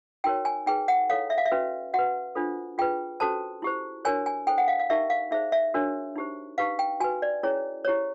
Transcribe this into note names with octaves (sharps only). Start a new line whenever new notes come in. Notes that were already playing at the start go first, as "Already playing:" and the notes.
D#4 F#4 A#4 C#5 G5
G#5
D#4 G#4 B4 G5
F#5
E4 A4 C#5 F5
E5
F5
E5
C#4 F#4 B4
F#4 B4 F#5
D4 F4 A4 C5
F4 G#4 B4 G5
C#4 F#4 A4 C5 A5
E4 G4 C5
D4 F#4 A#4 C#5 G#5
G#5
E4 A4 C5 G5
F#5
F5
F5
D#4 G4 A#4 E5
F5
D#4 G#4 C5 E5
E5
D4 F#4 A#4 C#5
D#4 G4 C5
D#4 G4 B4 F5
G5
F#4 B4 G#5
D5
C#4 E4 G#4 C#5
E4 G4 C5 C#5